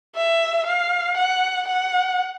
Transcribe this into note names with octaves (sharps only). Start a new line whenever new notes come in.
E5
F5
F#5
F#5